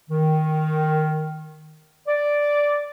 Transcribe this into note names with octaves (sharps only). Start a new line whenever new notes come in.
D#3
D5